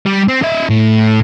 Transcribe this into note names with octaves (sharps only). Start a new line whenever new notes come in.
G3
C4
D#4 E5
A2